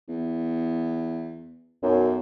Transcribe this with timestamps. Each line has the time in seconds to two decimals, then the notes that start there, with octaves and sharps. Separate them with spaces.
0.09 E2
1.83 B1 F#2